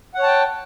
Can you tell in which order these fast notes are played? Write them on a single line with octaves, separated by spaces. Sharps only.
F#5 C#5 A5 G5